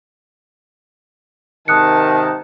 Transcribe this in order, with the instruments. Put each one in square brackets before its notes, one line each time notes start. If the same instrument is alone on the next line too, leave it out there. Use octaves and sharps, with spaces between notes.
[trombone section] G#2 C3 D#3 [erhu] A5 [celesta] D#6 F#6 C#7